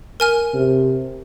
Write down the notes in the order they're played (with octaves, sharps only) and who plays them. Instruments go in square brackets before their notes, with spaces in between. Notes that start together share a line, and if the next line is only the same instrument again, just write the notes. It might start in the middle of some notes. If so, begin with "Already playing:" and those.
[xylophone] A#4 G#5 F6
[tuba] C3